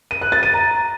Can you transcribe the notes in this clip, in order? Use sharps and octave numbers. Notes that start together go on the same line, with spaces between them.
D#7
F#6
A6
D#7
A#5